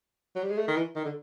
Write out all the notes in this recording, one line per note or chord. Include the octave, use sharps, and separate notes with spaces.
F#3
G3
G#3
A3
D#3
E3
D#3
D3